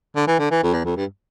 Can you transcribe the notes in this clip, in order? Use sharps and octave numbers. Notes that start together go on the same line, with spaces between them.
D3
E3
D3
E3
F2
E2
F2
G2